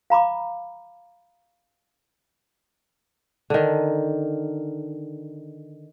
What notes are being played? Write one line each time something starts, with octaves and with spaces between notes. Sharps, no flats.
F5 A#5 B5 D6
D3 D#3